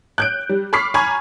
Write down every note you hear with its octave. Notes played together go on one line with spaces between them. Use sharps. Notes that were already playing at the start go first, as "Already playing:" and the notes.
F#6 G6 D7
G3
B5 C#6 D6 F6 B6 C7
G#5 A#5 B5 C#6 F6 G#6